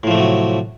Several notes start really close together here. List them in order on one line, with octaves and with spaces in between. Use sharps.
A2 F3 A3 C3 F#3